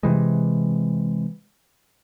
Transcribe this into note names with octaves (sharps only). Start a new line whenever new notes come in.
C3 E3 G#3